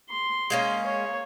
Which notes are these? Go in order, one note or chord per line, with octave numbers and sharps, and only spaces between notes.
C6
G#3 A#3 C#4
C#5